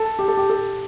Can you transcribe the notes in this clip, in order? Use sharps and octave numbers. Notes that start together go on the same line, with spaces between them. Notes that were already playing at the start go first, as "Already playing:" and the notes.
Already playing: A4
G4
A4
G4
A4